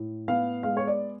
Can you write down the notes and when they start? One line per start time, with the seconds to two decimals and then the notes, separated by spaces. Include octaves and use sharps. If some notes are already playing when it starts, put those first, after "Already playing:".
Already playing: A2
0.28 B3 F5
0.63 G#3 F5
0.77 C#5
0.87 D5